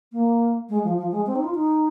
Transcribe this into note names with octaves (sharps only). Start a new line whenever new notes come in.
A#3
G#3
F3
F3
G#3
C4
D#4
F4
D#4